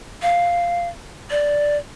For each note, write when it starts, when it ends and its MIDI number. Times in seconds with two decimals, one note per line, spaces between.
0.22 0.89 77
1.31 1.77 74